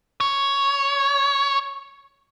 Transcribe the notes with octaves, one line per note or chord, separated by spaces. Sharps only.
C#5